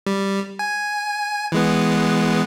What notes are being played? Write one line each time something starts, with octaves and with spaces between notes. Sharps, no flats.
G3
G#5
E3 G#3 B3